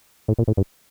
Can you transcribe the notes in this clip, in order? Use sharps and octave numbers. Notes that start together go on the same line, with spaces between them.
A2
A#2
A2
G2